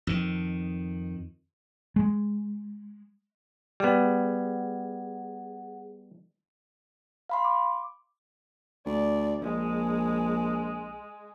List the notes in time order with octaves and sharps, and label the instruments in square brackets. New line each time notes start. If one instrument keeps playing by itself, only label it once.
[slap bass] F2 D#3
[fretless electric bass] G#3
[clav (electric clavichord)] G3 B3 [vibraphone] G#4 F#5
[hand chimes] F5 B5 C6
D6
[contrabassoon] D2 [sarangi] D5
[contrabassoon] A#1 [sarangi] G#3